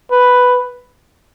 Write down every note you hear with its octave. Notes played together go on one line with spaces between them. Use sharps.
B4